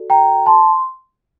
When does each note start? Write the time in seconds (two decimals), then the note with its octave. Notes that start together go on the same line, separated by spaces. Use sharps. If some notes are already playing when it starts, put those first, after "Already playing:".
Already playing: F#4 A4 D5
0.10 G5 A#5
0.46 A5 C6